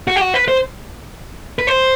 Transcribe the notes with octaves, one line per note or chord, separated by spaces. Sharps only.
F#4
G4
F#4
B4
C5
B4
C5